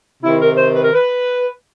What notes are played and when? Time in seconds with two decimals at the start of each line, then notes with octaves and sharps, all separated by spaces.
0.23 C3 D#3 E4
0.39 A#4
0.55 C5
0.71 B4
0.82 A#4
0.93 B4